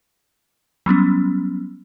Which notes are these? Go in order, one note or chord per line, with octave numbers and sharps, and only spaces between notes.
F#3 G3 B3 C#4